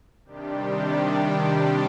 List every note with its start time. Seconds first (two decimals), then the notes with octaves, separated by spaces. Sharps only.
0.24 C3 D#3 G3 D4 G4